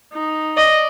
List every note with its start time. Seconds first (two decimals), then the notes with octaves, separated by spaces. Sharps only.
0.13 D#4
0.57 D5 D#5